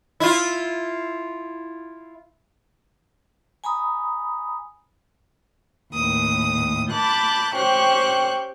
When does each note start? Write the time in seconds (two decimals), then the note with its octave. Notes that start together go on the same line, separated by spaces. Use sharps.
0.20 E4 F4
3.64 G#5 A#5 B5 D#6
5.94 D#2 A2 D#6
6.90 A5 B5 D6 F#6 G6 A6
7.55 C#4 G4 C5 G5 C#6 F#6